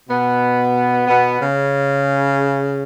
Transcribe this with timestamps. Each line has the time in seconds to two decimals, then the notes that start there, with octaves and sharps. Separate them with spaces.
0.08 B2 B3
1.08 B2 B3
1.41 C#3